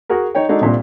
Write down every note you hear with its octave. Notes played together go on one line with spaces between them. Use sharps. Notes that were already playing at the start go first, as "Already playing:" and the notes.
F#4 G#4 A#4
D#4 C#5 G5
G#3 D4 D#4 F#4 G#4 A4
C2 A#2 D4